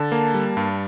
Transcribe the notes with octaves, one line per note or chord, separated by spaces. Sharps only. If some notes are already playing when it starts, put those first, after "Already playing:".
Already playing: D3 A5
A#3
G3
G2